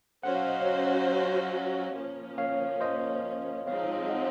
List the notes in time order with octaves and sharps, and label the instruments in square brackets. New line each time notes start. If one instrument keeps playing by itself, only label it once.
[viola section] F#3 C#4 F#4 C5 [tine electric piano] F#5
[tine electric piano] F5
D#5
C#5 F5
[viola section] F3 A#3 C#4
[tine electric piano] C#5 F5
C5 D#5
[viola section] F3 G#3 C4 D#4 [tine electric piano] C#5 F5
[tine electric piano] F5
D#5 F#5